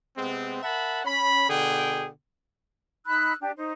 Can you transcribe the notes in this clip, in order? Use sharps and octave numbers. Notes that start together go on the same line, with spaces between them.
C3 G#3 B3 C4
A#4 E5 F#5 A5 B5
C#4 B5
B2 D3 G#4 G5
D#4 B5 E6 F#6
D4 G4
D#4 C5